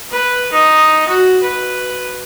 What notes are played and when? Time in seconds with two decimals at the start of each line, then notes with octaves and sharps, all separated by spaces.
0.11 B4
0.52 D#4
1.08 F#4
1.42 B4